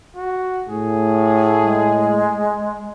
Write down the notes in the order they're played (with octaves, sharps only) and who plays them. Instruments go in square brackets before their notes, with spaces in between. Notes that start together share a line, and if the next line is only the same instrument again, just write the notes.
[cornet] F#4
[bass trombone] A2 [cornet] G#4
[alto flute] G#3